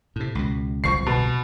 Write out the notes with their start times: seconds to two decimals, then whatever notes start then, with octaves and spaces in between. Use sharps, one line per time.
0.16 A2 C3
0.35 C#2 B2
0.84 D1 C2 F3 C#6 C7
1.06 B2